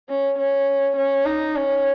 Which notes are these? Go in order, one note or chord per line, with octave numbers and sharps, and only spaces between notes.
C#4
C#4
C#4
D#4
C#4